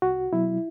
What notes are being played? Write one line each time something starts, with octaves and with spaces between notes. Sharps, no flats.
C2 F#4
B2 F#3 E4